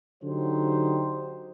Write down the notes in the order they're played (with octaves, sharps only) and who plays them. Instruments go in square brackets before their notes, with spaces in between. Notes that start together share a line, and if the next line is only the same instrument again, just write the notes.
[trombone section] D3 F#3 D#4 G4 C5